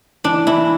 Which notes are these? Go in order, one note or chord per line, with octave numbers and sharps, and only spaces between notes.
E3 D4
E3 E4